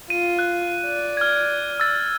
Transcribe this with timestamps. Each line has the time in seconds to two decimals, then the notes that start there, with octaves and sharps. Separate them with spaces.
0.10 F4 D#7
0.39 F#6
0.85 D5
1.17 F6 G#6
1.80 E6 A6